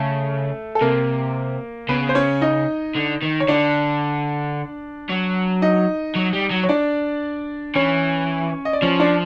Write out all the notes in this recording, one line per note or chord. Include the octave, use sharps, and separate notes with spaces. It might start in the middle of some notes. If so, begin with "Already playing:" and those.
Already playing: C#3 A3 A4
A4
C3 A#3 A#4
C#3 B3 B4
C5
C#4 C#5
D#4 D#5
D3
D#3
C#5
D3 D4 D5
F#3
D#4 D#5
F#3
G3
F#3
C#5
D4 D5
E3 C#4 C#5
D#5
D5
F3 C#4 C#5
D4 D5